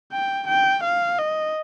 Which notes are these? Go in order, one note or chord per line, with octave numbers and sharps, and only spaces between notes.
G5
G5
F5
D#5